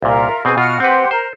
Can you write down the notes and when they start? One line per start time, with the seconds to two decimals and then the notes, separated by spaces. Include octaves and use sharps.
0.02 C2 A#2 F4 A#4 E5
0.45 B2 C4 G#4 B4 G#5
0.57 B2 F4 F#4 F#5 F6
0.80 C4 G4 B4 C5 F#5
1.11 A#4 C5